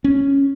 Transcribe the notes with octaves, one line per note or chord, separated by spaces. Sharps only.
C#4